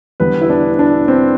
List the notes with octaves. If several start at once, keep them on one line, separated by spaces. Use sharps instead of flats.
E2 D3 G3 B3 B4
E4
D4
D4
C4